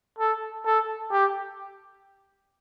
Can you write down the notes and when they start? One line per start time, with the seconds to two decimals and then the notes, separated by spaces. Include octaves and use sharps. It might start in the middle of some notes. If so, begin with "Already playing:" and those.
0.19 A4
0.65 A4
1.11 G4